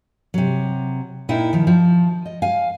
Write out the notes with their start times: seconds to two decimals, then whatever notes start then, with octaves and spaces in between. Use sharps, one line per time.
0.34 C3 F#3
1.29 A#2 D#4 E4 G5
1.53 D#3 F3
1.67 F3
2.26 D#5
2.42 F5 G#5